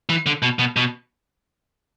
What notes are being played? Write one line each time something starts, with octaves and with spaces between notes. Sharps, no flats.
E3
D3
B2
B2
B2